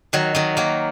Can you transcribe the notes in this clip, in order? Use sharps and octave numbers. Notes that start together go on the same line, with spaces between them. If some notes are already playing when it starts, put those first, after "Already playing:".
D#3 F#3
D#3 F#3
F#3 A#3